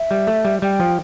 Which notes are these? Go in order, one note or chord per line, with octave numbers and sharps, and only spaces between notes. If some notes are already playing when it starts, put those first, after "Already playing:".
Already playing: E5
G3
A3
G3
G3 G5
F3